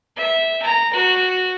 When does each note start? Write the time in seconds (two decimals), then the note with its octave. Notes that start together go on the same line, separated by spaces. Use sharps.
0.17 E5
0.62 A#5
0.93 F#4